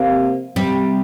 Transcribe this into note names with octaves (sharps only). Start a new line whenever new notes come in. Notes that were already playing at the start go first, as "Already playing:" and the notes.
Already playing: C3 A#3
C3 G3